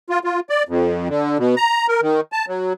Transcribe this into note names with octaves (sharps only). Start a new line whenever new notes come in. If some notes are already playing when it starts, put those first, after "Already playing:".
F4
F4
D5
F2
D3
B2
A#5
A#4
D#3
A5
F#3